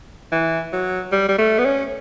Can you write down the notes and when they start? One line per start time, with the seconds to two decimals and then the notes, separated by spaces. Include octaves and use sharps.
0.32 E3
0.73 F#3
1.12 G3
1.29 G3
1.38 A3
1.59 B3
1.65 C#4